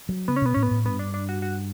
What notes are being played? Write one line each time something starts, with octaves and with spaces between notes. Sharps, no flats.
F#3
C#3 B3
C#4
B2 B3
A2 C#4
B3
A2
G2 B3
D4
D4
F#4
F#4